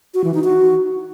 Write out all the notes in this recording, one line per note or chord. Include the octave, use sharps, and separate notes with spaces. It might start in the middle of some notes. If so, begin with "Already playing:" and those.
F#4
E3
D#4
F#4